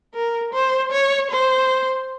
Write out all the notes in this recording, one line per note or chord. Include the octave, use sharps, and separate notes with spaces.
A#4
C5
C#5
C5